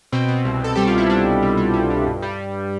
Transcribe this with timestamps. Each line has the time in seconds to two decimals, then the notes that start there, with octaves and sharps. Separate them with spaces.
0.12 B2 C4
0.28 B2
0.45 C2
0.61 C2 A4
0.75 G3 G4
0.87 F4
0.94 C2 E4
1.09 G3 D4
1.25 C2
1.42 G3
1.57 G3
1.74 G3
1.90 G3
2.07 G2
2.22 G3